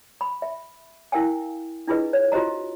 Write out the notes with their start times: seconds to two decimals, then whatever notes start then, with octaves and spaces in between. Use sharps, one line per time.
0.21 B5
0.42 E5
1.12 E4 A#4 F5 G5 G#5
1.87 D4 E4 F4 G#4 B4 D#5
2.13 C#5
2.32 F4 F#4 C5 D#5 A#5